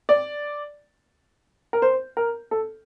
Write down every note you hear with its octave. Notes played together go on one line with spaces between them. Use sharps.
D5
A#4
C5
A#4
A4